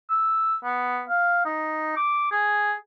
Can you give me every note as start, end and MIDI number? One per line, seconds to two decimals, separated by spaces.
0.10 0.56 88
0.64 1.03 59
1.09 1.40 77
1.45 1.94 63
1.97 2.28 86
2.31 2.73 68